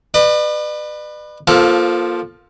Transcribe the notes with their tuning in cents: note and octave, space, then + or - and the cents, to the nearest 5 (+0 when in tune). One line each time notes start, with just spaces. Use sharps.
B4 +0 D5 +45
F3 +0 A#3 +25 A4 +0